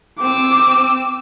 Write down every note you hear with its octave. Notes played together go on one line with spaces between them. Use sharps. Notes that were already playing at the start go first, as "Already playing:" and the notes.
C4 D6 E6